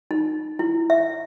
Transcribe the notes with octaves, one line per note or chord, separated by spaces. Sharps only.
D#4
E4
E5